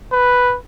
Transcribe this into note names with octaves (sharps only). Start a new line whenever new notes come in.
B4